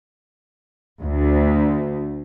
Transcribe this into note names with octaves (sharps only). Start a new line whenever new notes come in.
D2